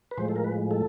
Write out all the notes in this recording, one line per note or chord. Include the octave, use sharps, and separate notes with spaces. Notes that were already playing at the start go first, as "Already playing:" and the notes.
B4
A2 F3 G#3 C5
A4
A#4
B4
A4